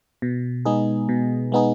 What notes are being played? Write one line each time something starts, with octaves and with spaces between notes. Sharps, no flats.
B2
G#3 B3 D#4 G#4
B2
G#3 B3 D#4 G#4